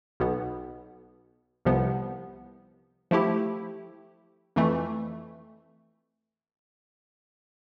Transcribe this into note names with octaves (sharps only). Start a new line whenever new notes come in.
B1 B2 B3
C2 C3 F3 B3
F3 A3 E4 G4
F2 E3 A3